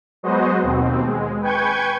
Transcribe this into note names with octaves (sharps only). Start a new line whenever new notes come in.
F#3 G#3 B3 F#4 C5 D#5
D#2 B2 C4
G#3
B4 G5 G#5 C#6 G6 G#6